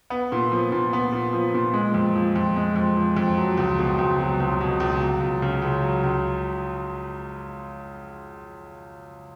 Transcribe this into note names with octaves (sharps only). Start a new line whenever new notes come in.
B3
A#2
F3
A#2
B3
A#2
F3
A#2
G#3
F2
F3
F2
G#3
F2
F3
F2
F#3
C#2
B2
C#2
F#3
C#2
B2
C#2
F#3
C#2
C#3
C#2
F#3
C#2